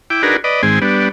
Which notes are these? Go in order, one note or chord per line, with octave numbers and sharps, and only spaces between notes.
E4 G5 D6
D4 D#4 F#4 G#4 A#4 B4
B4 D5 D#5
G#2 D#3 G#3 C4 G#5
G3 B3 D4